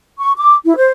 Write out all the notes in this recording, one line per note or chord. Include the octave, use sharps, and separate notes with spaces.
C#6
D6
E4
C5